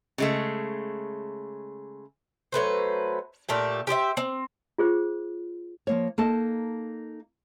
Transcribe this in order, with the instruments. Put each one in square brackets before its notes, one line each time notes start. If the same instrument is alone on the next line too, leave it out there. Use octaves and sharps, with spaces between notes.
[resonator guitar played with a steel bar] C#3 G#3 A3
[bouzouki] F#3 A3 B4 C5
A#2 A3 G4
G4 C5 D5 E5
C4
[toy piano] F4 G#4 C5
[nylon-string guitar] F3 A#3 C#5
A#3 D#4 A4 D#5 A5